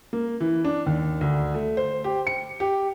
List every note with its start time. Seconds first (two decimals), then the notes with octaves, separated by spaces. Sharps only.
0.13 A#3
0.41 E3
0.65 D4
0.86 D#2
1.21 D2
1.54 A3
1.77 C5
2.04 G4
2.27 C#7
2.60 G4